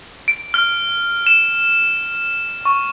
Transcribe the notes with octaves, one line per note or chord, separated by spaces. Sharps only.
D7
F6
E7
C#6